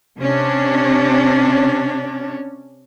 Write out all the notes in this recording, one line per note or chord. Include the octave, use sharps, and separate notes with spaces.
C3 C#4 D4